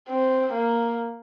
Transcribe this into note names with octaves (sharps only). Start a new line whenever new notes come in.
C4
A#3